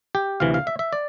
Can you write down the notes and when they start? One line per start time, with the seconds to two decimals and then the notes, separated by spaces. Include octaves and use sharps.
0.15 G4
0.40 D2 C3 E3 F5
0.54 F5
0.67 E5
0.79 E5
0.93 D5